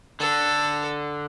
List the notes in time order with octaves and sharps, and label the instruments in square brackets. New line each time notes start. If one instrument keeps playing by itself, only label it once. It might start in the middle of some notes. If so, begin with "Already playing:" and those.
[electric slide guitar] D3 [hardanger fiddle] A4